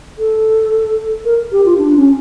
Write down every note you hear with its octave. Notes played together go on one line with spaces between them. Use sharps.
A4
A#4
G4
F4
D4
C#4